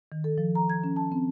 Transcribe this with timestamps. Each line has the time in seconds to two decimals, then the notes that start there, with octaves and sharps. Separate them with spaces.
0.12 D#3
0.24 A4
0.38 F3
0.55 A#5
0.70 G#6
0.84 C#4
0.96 A5
1.12 C4